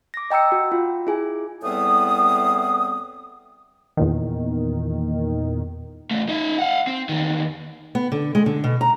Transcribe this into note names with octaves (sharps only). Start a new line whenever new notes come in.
D6 A#6
D#5 G5 A#5 E6 C#7
F#4
F4
E4 G#4 G#5
E2 A2 G3 B3 C4 D#6
E2 A#2 D#3
E2 A3
D#4 E5
F5 F#5
C4
E2 D#3
B3
D3
G#3
D3
B2
A#5